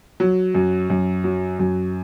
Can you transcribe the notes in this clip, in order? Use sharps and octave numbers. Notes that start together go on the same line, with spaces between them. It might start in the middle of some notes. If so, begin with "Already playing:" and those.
F#3
F#2
F#2
F#3
F#2